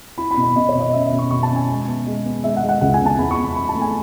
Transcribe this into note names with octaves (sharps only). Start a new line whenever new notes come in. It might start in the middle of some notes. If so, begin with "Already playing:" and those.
E4 B5
B5
B2
B5
B2 D#5
C#5
B2
D#5
C#4 E5
E5
B2
C#6
B2 C#6
A5
C#4
G#5
G#3
B3
G#3
B3
G#3 E5
F#5
G#3
F#5
C#2 F#5
G#5
B3
A5
E2 B5
C#6
E2
B5
E2 B5
A5
A3
G#5